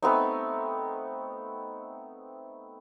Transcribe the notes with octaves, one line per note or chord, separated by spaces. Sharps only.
A3 B3 C4 D#4